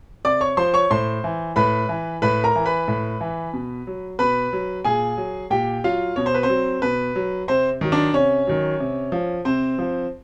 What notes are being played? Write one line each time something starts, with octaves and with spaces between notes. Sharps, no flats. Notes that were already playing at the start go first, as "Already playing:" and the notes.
C3 D5 D6
C#5 C#6
F3 C5 C6
C#5 C#6
A2 C5 C6
E3
A2 B4 B5
E3
A2 B4 B5
A#4 A#5
E3
B4 B5
A2
E3
B2
F#3
B2 B4 B5
F#3
A#2 G#4 G#5
F#3
A#2 G4 G5
F#3 F4 F5
B2 C#5
C5
B4
C4 C5
F#3
B2 B4
F#3
C3 C4 C5
D#3 F#3
D4 D5
C3 C#4 C#5
D#3 F#3
C3
F3
C3 C4 C5
F3